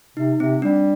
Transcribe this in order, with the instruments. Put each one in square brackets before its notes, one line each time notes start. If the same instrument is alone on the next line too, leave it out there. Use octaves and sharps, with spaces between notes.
[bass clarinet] C3 [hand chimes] D#4
[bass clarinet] C3 [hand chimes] C4
[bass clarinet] G3 [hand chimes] D4